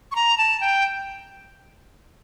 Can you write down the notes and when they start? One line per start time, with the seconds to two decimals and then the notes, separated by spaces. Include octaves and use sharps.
0.12 C#6
0.15 A#5
0.38 A5
0.61 G5